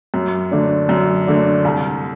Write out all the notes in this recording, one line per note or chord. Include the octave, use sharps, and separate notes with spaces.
F#2
D3 A3 D4
F#2
D3 A3 D4
C2